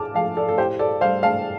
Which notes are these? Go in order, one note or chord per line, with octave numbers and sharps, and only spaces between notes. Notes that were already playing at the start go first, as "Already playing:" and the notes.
Already playing: A2 A3 A5 D6 F6
F3 A3 F5 A5
A4 D5
A4
A2 G4 C5
A4 D5
G3 C5 F5
F5 A5